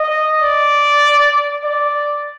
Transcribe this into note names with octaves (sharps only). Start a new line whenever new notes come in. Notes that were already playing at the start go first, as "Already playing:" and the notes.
Already playing: D#5
D5
D5